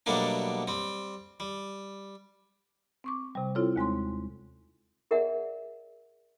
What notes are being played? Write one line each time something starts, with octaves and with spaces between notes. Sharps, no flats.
B2 F#3 G3 A3 A#3 D4
G3 C4
G3
C4 C#6 D6
C3 G3
C4 E4 F4 A4 C#5
D#2 G#3 C4 C6
G#4 A#4 D5 E5 F#5